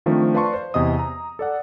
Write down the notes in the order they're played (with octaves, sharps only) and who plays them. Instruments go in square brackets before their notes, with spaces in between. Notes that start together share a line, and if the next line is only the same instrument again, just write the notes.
[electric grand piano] D#3 F3 A3 C4 D4 F4
B4 D5 F5 A5 C6 C#6
C5
E2 C3 D#5 D#6
A#5
A4 D5 F#5